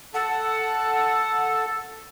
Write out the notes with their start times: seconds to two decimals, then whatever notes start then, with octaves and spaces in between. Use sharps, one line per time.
0.14 A4 F#5 A5